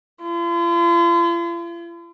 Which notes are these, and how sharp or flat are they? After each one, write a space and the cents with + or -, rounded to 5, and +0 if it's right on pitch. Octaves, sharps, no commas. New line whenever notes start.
F4 -45